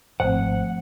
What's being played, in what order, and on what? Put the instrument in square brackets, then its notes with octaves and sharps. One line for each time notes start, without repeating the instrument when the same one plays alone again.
[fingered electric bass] D#1 G#1 [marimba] F3 A3 C4 [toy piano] C5 [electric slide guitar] F#5